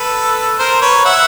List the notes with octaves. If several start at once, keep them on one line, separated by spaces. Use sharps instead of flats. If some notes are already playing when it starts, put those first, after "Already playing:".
Already playing: A4 B4
A#4 C5
B4 C#5
E5 F#5